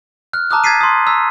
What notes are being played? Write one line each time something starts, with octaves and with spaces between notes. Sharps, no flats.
F6 F#6
A5 A#5 D6 D#6 F#6
G#6 A6 B6 C7 D#7
C6 D#6
A#5 E6 B6